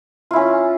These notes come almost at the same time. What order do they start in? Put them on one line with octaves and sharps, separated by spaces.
F4 E4 C#4